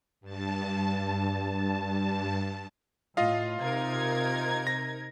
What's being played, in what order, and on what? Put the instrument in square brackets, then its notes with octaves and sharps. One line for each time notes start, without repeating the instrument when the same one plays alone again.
[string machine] G2 A5
[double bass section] A2 [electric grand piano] F4 D#5 F5
[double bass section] C3 [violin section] D#4 A#4 G#6
[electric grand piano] A#6